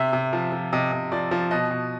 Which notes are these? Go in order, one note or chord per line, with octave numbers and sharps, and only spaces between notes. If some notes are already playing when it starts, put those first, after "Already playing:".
Already playing: C3 E5
C3
F3
F3
C3 D#5
C3
F3 D5
F3
B2 D#5
B2